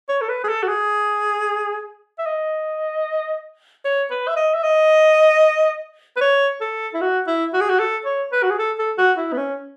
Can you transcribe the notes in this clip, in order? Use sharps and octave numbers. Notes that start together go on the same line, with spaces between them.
C#5
A4
B4
G#4
A4
F#4
G#4
E5
D#5
C#5
B4
E5
D#5
E5
D#5
B4
C#5
A4
E4
F#4
E4
F#4
G#4
F#4
A4
C#5
B4
F#4
G#4
A4
A4
F#4
E4
B3
C#4